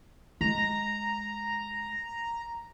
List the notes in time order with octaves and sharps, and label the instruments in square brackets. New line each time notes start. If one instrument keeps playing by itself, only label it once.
[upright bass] G#3 [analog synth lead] A#5